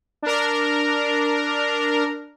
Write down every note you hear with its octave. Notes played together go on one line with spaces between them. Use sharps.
D4 A#4